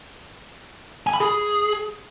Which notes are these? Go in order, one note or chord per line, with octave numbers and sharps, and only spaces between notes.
G#5
B5
G#4